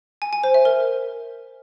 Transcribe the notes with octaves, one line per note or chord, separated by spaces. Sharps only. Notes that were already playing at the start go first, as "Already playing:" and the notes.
G#5
G#5
C5
E5
A#4